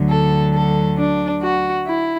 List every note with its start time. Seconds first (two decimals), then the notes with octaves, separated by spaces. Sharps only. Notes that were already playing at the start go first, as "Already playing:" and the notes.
Already playing: D2 D3 F#3
0.10 A4
0.55 A4
0.99 D4
1.43 F#4
1.88 E4